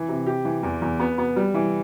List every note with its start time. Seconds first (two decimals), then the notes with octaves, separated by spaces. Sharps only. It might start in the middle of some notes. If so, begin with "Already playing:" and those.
Already playing: E3
0.08 C3
0.26 G4
0.45 E3
0.63 E2
0.82 E2
0.99 B3
1.18 B3
1.36 G3
1.54 E3